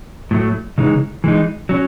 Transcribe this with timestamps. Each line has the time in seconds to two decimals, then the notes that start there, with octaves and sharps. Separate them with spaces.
0.31 A2 F#3 A3
0.78 C#3 E3 G#3 D#4
1.24 E3 G#3 D#4
1.69 F#3 C#4